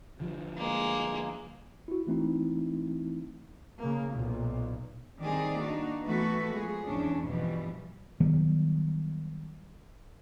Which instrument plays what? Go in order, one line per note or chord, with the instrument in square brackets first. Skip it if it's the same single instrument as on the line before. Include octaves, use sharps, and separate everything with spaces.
[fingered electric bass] D3 F3 G3
[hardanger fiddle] G#3 A#3
[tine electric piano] E4 F#4
E3 A3 C4 D#4 E4
[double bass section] C#3 A#3
B1 A#2
[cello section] D#3 G3 C4 D#4 G#4 D5
A#3 D4 D#4 F#4
E3 A3 B3 F#4 A4 B4
F3 G#3 G#4
E2 C#4 D4
G2 B2 E3 F3 G3
[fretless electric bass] D#3 F#3 G3 B3